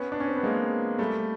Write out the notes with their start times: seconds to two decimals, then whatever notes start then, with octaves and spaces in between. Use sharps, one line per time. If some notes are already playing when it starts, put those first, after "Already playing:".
Already playing: B3 C#4
0.12 D4
0.20 C#4
0.28 C4
0.36 B3
0.43 G#3 A#3
0.99 G3 A3